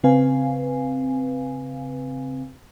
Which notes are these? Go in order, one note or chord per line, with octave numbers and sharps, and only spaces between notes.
C#3 C4 B4 F5 G#5